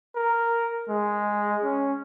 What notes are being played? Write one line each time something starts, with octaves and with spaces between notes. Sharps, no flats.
A#4
G#3
C#4